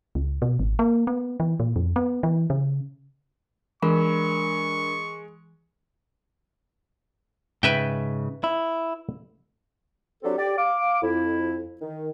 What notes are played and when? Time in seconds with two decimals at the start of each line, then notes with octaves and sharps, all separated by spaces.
0.15 C#2
0.42 B2
0.59 G#1
0.79 A#3
1.07 B3
1.40 E3
1.60 A#2
1.76 F2
1.96 B3
2.23 E3
2.50 C#3
3.82 E3 G#3 D4 A#4 B5 C#6
7.63 G#2 C#3 B4 E5 G5
8.44 E4
10.24 F#3 C4 D4 G4 A4
10.38 G4 D5
10.58 F5 D6
11.03 F2 E4
11.82 D#3